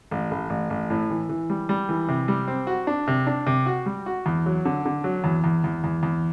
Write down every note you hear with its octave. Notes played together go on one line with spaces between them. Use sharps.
A1
A1
A1
A1
A2
E3
E3
G3
G3
E3
C3
G3
C4
F#4
D4
C3
D4
C3
F#4
G3
F#4
E2
F#3
D3
D3
F#3
E2
E2
E2
E2
E2